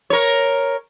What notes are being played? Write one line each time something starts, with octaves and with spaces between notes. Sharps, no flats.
A#4 C#5